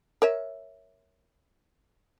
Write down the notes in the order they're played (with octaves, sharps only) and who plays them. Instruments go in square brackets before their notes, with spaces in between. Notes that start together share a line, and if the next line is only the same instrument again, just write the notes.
[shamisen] A#4 C#5 E5